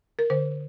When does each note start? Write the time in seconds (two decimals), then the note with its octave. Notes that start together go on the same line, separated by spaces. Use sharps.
0.19 A#4
0.30 D3 C5